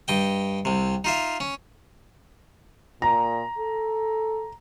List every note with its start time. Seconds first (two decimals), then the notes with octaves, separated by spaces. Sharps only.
0.08 G2 D#5 G5
0.65 C2 C3
1.04 D#4 F4 E5
1.40 C#4
3.02 A#2 A#5
3.58 A4